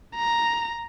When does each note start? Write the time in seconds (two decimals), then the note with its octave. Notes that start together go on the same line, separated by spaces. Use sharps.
0.16 A#5